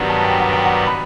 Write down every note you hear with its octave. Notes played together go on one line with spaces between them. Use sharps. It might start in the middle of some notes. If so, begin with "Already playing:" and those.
Already playing: G2 D#3 F#3 B3 D4
A5
G5
F#5
G5
F#5
B5